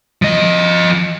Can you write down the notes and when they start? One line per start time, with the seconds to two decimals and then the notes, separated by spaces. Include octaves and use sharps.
0.22 F3 D#5